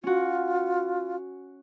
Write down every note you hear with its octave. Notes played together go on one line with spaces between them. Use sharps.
C#4 F4 F#4